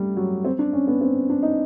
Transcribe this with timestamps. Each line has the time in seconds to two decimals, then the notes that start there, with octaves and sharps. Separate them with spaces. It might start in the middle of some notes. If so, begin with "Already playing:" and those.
Already playing: G3 A3
0.16 F#3
0.44 C4
0.59 D4
0.73 C#4
0.87 B3
1.01 C4
1.30 D4
1.43 D#4